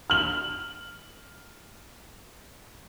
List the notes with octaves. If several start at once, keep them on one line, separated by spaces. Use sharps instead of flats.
F6 F#7